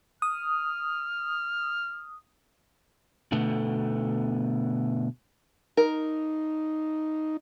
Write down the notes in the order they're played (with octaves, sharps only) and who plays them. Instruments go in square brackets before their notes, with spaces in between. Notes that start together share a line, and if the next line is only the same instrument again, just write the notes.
[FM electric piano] D#6 [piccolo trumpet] F6
[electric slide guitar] B2 D3 A3 B3
[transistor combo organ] D#4 [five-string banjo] A#4